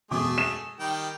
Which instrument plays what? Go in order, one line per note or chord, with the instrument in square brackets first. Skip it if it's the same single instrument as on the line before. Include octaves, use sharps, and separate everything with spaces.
[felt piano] E1 B2 D6 [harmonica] A3 G#4
[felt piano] E7
[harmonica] D#3 G3 G5